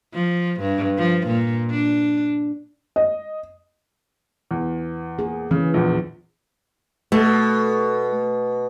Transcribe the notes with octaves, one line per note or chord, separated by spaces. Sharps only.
F3
G2
F3
A#2
D4
D#5
E2
A#3 G#4
C#3 E3
A#1 E2
B2 A3